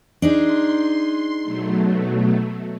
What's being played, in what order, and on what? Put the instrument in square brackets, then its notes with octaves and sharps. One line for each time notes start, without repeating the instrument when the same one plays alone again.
[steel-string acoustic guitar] D4 D#4 G#4 [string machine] C6
[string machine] B2 F#3 A3